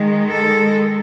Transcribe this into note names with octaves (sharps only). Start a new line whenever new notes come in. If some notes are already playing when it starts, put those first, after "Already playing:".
Already playing: D#3 G#3
A4